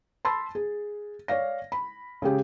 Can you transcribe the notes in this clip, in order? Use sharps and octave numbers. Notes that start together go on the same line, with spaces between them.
A5 B5 C6 E6 A6
G#4
C#5 D5 F5 A#6
B5
C#3 G#3 G4 G#4